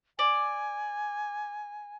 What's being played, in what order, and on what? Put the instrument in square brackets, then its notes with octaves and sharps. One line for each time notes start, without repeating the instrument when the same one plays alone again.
[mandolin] D5 [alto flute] G#5